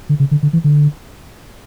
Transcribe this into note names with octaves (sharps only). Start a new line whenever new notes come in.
D3
C#3
D3
D3
E3
D3